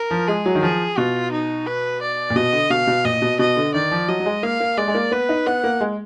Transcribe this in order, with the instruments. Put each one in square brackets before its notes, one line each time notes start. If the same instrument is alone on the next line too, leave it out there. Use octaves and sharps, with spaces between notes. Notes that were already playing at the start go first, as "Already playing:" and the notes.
Already playing: [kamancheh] A#4
[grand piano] F3
[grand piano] G#3 [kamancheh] G#4
[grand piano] F#3
D#3
[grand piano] F3 [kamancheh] G#4
[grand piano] B2 [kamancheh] F4
[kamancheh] D#4
B4
D5
[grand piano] A#2
[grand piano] B2 [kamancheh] D#5
[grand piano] D3
[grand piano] B2 [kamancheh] F5
[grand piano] B2
[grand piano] A#2 [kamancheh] D#5
[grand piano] B2
[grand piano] B2 [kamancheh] D#5
[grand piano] D3
[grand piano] D#3 [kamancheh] D5
[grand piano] F3
[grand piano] F#3 [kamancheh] D#5
[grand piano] F#3
G#3
[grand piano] A#3 [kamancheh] F5
[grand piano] A#3
[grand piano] G#3 [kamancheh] D5
[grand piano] G#3
A#3
[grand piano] B3 [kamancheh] B4
[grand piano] D#4
[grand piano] B3 [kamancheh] F#5
[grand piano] A#3
G#3